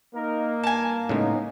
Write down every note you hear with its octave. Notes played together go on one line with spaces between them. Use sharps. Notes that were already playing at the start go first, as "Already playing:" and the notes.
A#3 D#4 A#4
G2 G#5 A5
A2 C#3 G#3 B3 C#4 D#4